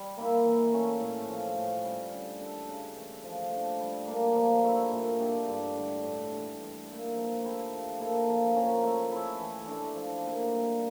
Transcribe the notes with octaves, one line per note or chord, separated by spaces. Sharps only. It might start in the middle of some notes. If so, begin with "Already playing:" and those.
Already playing: G3
A#3 E4
E3
A3 C#4
A2
F3 C#4
A2
G3 C#4
D3
A3 D4 A4
C#3
E3 A3
F3
A3 D4
G3
A#3 D4
F3
A3 E4
A#2
A3 D4 G4
G2
D3 G3 D4
A2
E3 G3 D4
E3
A#3 E4
F3
A3 E4 G4
F3
A#3 E4 A4
F3
C#4 F4 A#4
A3
E4 A4 C#5
E3
A3 D4
F3
A#3 E4 G4
G3